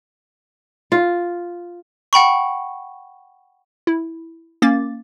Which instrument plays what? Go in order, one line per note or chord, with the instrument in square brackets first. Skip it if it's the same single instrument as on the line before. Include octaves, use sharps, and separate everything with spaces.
[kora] F4
[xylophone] F#5 G5 B5 C#6
[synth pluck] E4
A#3 C#4 D6 A6